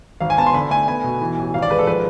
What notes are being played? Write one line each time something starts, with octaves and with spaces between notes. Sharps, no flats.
G#1 F5
G#5
B3 A5
C6
D3 B5
A3 G#5
B3 G#5
B2
E3
A1
G#1 F5
D5
G#3 B4
A4
F3 B4